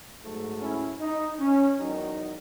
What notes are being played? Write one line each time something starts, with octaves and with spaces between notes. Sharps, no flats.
G#2 F#3 A3
C#4 E4
D#4
C#4
E2 D#3 F#3 D#4